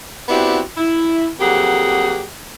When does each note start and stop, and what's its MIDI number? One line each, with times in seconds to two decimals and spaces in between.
0.29 0.60 59
0.29 0.60 60
0.29 0.60 62
0.29 0.60 64
0.29 0.60 66
0.29 0.60 67
0.77 1.27 64
1.40 2.23 41
1.40 2.23 54
1.40 2.23 58
1.40 2.23 67
1.40 2.23 68
1.40 2.23 78